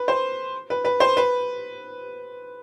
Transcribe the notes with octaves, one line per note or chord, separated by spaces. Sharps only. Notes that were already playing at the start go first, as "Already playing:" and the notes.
Already playing: B4
C5
B4
B4
C5
B4